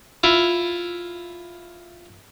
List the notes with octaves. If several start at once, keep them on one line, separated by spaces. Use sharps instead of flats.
E4 F4